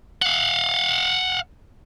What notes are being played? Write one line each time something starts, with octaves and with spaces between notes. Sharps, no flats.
F5 F#5